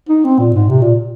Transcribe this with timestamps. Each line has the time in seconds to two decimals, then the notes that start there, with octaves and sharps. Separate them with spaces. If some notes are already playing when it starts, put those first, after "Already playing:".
0.09 D#4
0.24 C4
0.39 A#2
0.54 G#2
0.69 C3
0.82 A#2